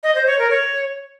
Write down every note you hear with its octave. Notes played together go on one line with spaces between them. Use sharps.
D#5
C5
C#5
A#4
C#5